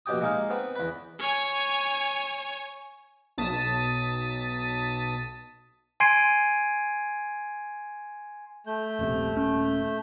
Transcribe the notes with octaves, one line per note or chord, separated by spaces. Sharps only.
A#1 B2 G4 G5 D#6
G#3 A#3 D#4 F5
B3 C4
E2 B4
C#5 G#5
B1 A5 D#6 B6
G#5 C6 G#6 C7 D7 D#7
A3 G6
D#1 A#1 C3
D#1 C#4